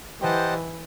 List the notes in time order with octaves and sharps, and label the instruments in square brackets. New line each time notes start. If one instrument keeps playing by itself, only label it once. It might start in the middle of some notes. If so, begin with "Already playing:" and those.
[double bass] E3 [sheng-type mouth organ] G4 C5 D#5 F#5 A5